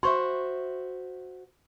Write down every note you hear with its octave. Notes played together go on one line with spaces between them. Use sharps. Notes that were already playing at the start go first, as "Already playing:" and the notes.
F#4 C5 E5 C6 C#6